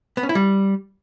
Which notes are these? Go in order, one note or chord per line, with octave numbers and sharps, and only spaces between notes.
B3
C#4
E4
G3